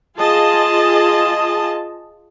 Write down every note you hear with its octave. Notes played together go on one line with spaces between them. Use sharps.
F4 G#4 D#5 A5